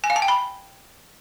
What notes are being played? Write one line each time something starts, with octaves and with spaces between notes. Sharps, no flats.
G#5
F5
A5
G5
B5